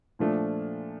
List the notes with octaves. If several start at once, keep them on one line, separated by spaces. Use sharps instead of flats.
A#2 F3 A3 D4